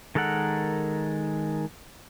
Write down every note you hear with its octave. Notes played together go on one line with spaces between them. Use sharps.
D#3 G#3 A4 A#4 F#5